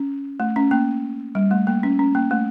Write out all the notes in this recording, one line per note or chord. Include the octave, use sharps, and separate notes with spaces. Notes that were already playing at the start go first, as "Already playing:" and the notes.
Already playing: C#4
A3
C#4
A#3
G3
A3
A#3
C#4
C#4
A#3
A3